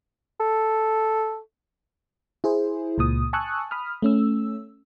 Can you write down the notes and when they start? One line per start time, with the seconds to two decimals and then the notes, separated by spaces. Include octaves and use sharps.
0.40 A4
2.44 E4 G#4 C5
2.98 C#2 A#2 D#6
3.33 G#5 A5 C#6 D#6 E6 F#6
3.71 B5 D#6 F6
4.02 A3 C#4 E6